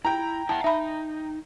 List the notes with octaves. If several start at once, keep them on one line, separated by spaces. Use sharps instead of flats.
E4 G5 A#5
E4 E5 F#5 A5
D#4 E5 B5